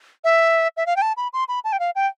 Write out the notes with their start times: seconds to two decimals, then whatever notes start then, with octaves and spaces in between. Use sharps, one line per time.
0.24 E5
0.77 E5
0.86 F5
0.96 G5
1.02 A5
1.17 B5
1.33 C6
1.48 B5
1.64 A5
1.72 G5
1.80 F5
1.95 G5